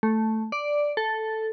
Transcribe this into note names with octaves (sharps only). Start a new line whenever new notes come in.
A3
D5
A4